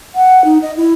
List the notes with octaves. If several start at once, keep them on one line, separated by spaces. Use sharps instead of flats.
F#5
D#4
D#5
E4